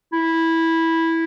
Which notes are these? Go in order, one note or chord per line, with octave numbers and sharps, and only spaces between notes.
E4